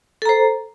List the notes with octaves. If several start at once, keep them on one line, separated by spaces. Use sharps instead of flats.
A4 C5 A#5